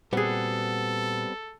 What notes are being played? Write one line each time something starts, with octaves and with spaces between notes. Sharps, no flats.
A#2 G3 B3 C4 F#4 G#4 A4 F#5